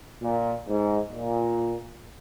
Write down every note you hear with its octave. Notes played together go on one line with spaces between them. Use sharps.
A#2
G#2
A#2